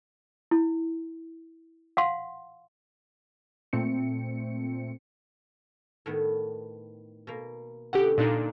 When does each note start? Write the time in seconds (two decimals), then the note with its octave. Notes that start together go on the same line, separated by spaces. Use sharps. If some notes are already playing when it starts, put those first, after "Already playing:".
0.51 E4
1.97 F5 F#5 C6
3.73 A#2 A3 C4 C#7
6.06 A2 D#3 B3
7.27 B2 A#3
7.93 B2 D3 C#4 G4 F#5
8.18 A#2 D4 D#4 A#4